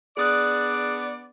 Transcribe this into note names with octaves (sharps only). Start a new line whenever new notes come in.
B3 D4 G#4 D5 D#6 F#6